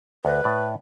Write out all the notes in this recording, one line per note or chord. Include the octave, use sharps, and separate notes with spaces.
D2 B4
A2 D5